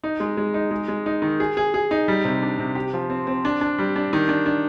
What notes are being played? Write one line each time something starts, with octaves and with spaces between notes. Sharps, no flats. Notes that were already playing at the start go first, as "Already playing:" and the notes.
D#4
G#3
G#3
D#4
G#3
G#3
D#4
D#3
G#4
G#4
G#4
D#4
G3
C3
D4
C3
G4
F3
C4
C4
D4
D4
G3
D4
D#3
D4
D4